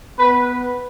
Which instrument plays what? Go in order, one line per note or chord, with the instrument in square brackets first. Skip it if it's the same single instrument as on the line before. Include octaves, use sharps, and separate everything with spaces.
[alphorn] B3 [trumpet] B4